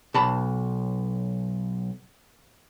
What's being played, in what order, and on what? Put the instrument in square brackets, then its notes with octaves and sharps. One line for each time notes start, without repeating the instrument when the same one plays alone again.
[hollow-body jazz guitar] B1 A5 B5